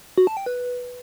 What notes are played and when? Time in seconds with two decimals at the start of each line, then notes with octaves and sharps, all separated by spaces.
0.18 F#4
0.27 A5
0.37 G5
0.46 B4